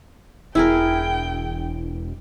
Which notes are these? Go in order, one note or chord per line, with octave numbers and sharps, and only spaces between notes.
E1 E4 G#4 A#4 G5